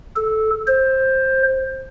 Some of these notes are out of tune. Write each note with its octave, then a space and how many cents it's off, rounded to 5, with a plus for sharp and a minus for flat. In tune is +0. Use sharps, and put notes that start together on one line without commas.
A4 -10
C5 +15